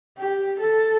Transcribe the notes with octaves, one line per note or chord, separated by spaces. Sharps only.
G4
A4